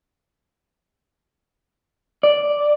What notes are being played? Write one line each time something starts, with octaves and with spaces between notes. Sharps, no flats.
D5